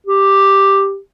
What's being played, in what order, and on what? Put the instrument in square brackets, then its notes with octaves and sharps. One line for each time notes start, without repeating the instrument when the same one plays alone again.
[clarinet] G4